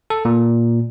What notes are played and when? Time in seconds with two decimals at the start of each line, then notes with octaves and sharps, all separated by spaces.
0.10 A4
0.25 A#2